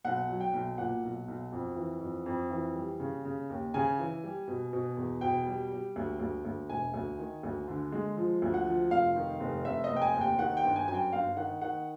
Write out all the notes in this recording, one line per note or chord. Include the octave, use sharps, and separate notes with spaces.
B1 F#5
F#3
G5
B1
A#2 F#5
B1
B1
F2
E3
F2
F2
E3
G3
C#3
C#3
D#2
C#3 G#5
E3
G3
B2
B2
E2
B2 G5
G3
G3
D2
D2
D2
E1 G#5
D2
D#3
D2
D3
G#3
F3
D2
F#5
F3
F1 F5
D#3
F1
F1 E5
D#5
F1
G5
G#5
D#2
G5
D#3 F#5
G5
G1
G#5
F#2 G#5
G5
G1 F5
D#3 F#5
D#3 F#5